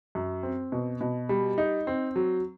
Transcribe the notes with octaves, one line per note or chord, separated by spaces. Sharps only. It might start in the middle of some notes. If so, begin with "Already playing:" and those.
F#2
C4
B2
B2
G3
D#4
C4
F#3